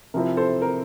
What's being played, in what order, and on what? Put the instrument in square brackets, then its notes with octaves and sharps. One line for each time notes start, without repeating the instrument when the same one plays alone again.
[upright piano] C3 F3 C4 E4 [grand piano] A#4
[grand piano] A4 C5
A#4